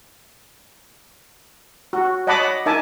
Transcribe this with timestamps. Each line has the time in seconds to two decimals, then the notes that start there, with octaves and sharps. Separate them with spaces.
1.93 F#4
2.27 C#5 D#5 F#5 A5 B5 D6
2.66 D#4 A#4 E5 G#5 A5 D6